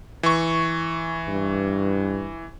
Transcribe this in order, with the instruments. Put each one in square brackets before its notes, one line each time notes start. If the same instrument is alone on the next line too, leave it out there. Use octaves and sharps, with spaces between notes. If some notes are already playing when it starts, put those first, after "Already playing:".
[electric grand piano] E3 C#6
[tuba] G2